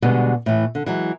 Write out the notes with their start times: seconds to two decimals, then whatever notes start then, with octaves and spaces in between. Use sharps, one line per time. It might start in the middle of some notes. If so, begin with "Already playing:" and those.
0.02 B2 D3 G3 G#3 B3
0.46 A2 E3
0.75 D3
0.86 E3 F#3 G#3